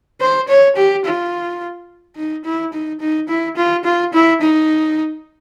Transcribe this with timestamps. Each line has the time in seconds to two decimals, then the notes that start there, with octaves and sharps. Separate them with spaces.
0.21 C5
0.48 C#5
0.76 G4
1.05 F4
2.16 D#4
2.45 E4
2.73 D#4
3.00 D#4
3.29 E4
3.57 F4
3.84 F4
4.13 E4
4.41 D#4